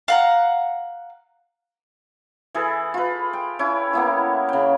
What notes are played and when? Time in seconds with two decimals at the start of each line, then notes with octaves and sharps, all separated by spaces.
0.08 F5 F#5 A#5
2.55 E3 G#4 A4 B4
2.94 F4 B4
3.33 G5
3.59 C#4 E4
3.93 A#3 B3 E4
4.49 C#3 G5